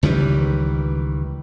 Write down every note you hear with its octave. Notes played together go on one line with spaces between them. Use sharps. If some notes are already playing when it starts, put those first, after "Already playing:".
C#2 D#3 E3 G3